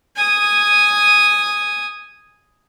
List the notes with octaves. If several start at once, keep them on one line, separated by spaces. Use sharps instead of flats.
G#5 D#6